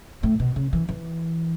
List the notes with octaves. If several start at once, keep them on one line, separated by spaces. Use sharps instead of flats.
A2
B2
C#3
E3
E3